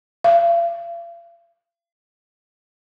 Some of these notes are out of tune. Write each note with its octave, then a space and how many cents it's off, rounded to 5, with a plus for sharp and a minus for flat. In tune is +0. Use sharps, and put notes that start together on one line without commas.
F5 -40